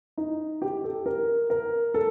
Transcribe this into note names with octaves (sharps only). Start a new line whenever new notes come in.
D#4
G4
A4
A#4
A#4
A4